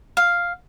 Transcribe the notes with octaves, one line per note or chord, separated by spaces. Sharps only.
F5